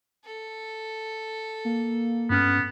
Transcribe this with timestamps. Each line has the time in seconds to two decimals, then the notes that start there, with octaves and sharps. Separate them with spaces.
0.25 A4
1.65 A#3
2.30 G2 B3 C#4 F6